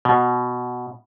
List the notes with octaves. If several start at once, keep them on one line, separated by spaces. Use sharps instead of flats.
B2